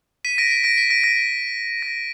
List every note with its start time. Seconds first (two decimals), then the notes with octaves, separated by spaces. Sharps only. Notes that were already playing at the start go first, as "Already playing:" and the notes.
0.25 B6 D#7
0.38 A#6 D7
0.51 B6
0.64 A#6 D7
0.78 B6
0.90 A#6 D7
1.04 A#6 D7
1.83 A#6